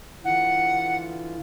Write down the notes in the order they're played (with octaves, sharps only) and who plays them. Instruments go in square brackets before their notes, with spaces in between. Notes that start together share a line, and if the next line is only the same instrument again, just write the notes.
[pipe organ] D3 E3 F4 [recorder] F#5